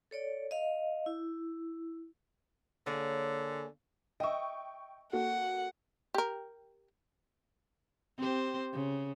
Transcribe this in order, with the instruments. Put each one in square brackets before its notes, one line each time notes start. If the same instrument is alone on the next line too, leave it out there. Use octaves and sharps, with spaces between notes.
[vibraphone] A4 C#5 D5
D#5 F5
E4
[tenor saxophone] D3 [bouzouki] A#3 G#4 C#5
[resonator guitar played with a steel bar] D#5 E5 [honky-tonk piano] G5 C#6
[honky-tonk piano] A#3 F#4 A4 [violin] F#5
[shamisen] G4 A#4
[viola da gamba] C4 G4 C5
C#3